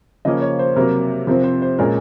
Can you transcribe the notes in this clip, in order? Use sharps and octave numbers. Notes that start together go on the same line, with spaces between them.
C#3 F3 A#3 C#4 D#5
C#5
C5
C3 F#3 A#3 A#4
C3 F3 C4 A#4
C5
C5
A#2 G#3 C#4 A#4